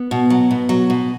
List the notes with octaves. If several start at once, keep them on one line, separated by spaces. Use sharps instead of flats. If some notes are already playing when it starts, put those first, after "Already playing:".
Already playing: B3
B2
F#3
B2
F#3
B2